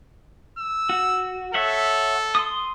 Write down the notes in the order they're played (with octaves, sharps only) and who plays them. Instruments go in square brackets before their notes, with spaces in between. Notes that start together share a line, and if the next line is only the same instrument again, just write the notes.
[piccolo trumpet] E6
[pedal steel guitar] F#4
[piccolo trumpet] A4 [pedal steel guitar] C#5 E5 F#5
[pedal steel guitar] C6 D#6